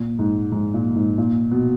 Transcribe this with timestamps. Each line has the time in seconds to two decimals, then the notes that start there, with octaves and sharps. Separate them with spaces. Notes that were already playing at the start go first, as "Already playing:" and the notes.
Already playing: A#2
0.19 G#2
0.52 G#2
0.74 A#2
0.96 G#2
1.18 A#2
1.51 B2